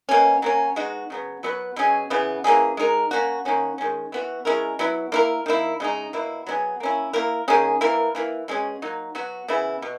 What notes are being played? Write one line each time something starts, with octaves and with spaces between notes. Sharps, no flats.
B2 A#3 C#4
F#3 A#3 C#4
G#3 B3 D#4 F#4
C#3 F#3 B3
F#3 B3 F#4 B4
B2 F#3 C#4 G#4
C#3 E3 B3
E3 A#3 C#4 G#4
G#3 D#4 A#4
A#3 C#4 F#4
D#3 A#3 C#4 F#4
D#3 G#3 C#4
E3 B3 F#4
G#3 C#4 E4 A#4
F#3 B3 E4
A#3 E4 A#4
D#3 A#3 E4
C#3 G#3 D#4
B2 A#3 E4
F#3 B3 E4 G#4
A#3 C#4 E4
A#3 E4 A#4
D#3 A#3 C#4 G#4
E3 A#3 E4 A#4
E3 A#3 E4
B2 G#3 C#4 G#4
F#3 A#3 D#4
F#3 B3 F#4
C#3 E3 B3 E4
B2